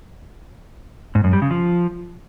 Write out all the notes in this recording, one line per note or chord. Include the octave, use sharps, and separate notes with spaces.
G#2
F#2
G3
C#3
F3